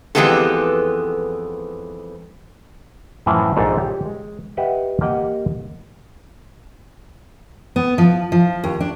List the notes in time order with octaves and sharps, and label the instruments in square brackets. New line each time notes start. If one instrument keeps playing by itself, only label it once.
[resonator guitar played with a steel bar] F2 E3 G#3 B3 G4 A4
[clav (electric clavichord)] F#2 A2 E3 F3
A#1 G#2 A4 C5
G4 C#5
G#3
G4 B4 D#5 E5 F#5 G5
A#3 G4 D#5 F#5 G5
[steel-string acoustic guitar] B3
F3
F3
D#2
D4